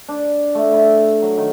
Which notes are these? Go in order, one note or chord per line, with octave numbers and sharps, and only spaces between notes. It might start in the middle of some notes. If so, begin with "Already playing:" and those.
D4
A3
E4
F#3
D#3